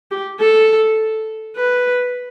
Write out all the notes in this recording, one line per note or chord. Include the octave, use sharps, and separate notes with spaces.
G4
A4
B4